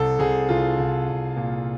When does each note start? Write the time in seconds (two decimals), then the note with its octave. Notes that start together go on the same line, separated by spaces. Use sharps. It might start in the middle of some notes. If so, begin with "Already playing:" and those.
Already playing: C2 A4
0.19 C2 G#4
0.49 C2 F4
0.78 C2
1.08 C2
1.37 A#2